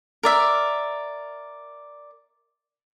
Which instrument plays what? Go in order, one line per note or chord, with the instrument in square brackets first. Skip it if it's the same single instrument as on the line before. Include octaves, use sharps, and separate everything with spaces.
[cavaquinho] A#4 D5 E5